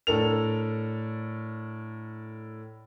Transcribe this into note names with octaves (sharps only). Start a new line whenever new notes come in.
A2 D4 A4 A#4 F7